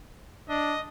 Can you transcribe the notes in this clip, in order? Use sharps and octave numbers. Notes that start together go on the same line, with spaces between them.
D4 D#5